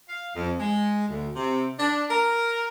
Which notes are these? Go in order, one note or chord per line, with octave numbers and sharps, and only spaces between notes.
F5
F2
G#3
D2
C3
D4
A#4